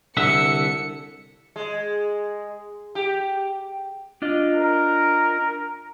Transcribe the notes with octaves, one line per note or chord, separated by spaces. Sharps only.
C2 D3 E5 C#7
G#3
G4
D4 F4 D#5
A#4